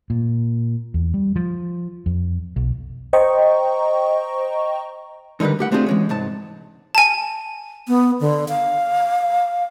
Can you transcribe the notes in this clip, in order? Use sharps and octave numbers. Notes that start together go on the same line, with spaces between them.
A#2
E2
G3
F3
F2
B1
C5 D#5 G5 A#5 C#6
D3 D#3 G3 A#4 B4
A2 G4 F#5
A3 C4 D4 F4 G4 G#4
E3 G#3 C#4
C2 G#2 A5
G#5 A5
B3
D3
F5